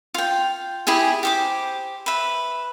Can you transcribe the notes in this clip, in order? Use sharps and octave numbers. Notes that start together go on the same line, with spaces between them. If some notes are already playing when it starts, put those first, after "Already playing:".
F4 G5
E4 G4 G#4 G#5
G4 C5 D6
B4 E5